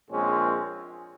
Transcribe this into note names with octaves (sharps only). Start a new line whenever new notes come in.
A#1 A#2 G#3 C4 C#4